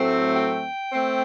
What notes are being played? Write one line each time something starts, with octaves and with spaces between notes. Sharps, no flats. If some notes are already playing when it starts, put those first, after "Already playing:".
Already playing: A2 F#3 A3 C4
G5
A3 C4